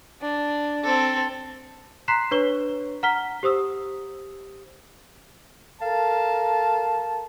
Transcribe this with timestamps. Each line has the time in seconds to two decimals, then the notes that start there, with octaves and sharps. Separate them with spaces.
0.21 D4
0.83 C4 A4
2.08 A#5 C6 F#6 B6 C7 E7
2.31 D4 B4 C#5 C#6 G7
3.03 F#5 A#5 F6 B6 G7
3.43 G4 C5 D#6 E6
5.82 A4 A#4 F5 A5